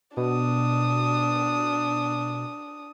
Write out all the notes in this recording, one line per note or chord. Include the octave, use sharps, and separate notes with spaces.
B2 D4 D#6